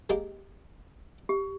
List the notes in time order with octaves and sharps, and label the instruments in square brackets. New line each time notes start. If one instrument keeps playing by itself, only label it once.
[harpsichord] G#3 A#3 G4
[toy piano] G4